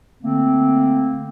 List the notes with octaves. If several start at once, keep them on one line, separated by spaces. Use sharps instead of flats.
D3 A3 A#3 C4